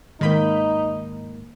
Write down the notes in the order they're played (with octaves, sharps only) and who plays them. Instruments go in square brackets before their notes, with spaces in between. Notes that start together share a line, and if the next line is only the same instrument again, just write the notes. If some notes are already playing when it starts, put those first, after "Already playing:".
[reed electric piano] G#2 A#3 [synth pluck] D#3 B5 G6 [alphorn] D#4